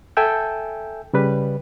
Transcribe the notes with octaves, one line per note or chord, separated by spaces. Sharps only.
A4 E5 G5 G#5 E6 G6
C#3 G3 B4